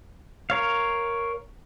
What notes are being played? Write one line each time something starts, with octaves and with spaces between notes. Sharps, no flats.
A#4 C#5 F5